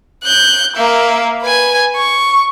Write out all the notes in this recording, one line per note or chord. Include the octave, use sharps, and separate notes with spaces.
F#6 G6
A#3 E5
B4 G#5
C#6